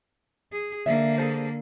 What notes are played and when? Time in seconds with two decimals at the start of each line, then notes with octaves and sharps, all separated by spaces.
0.52 G#4
0.86 D3 A#3 D5 E5
1.18 G#4 A4 C5